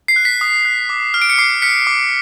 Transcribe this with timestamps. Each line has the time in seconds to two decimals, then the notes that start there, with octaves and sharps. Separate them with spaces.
0.08 C7
0.16 F#6
0.25 B6
0.41 D#6
0.65 F#6
0.89 D6
1.14 F6
1.22 D7
1.30 C#7
1.38 D6 C7
1.62 F6 B6 C#7
1.87 D6